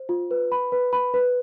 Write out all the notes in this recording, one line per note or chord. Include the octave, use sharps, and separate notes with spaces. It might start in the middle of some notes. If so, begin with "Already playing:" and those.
Already playing: C5
F4
B4
B5
B4
B5
B4